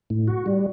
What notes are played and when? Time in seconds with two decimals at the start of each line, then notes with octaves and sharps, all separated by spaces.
0.10 A2
0.27 F#4
0.46 G3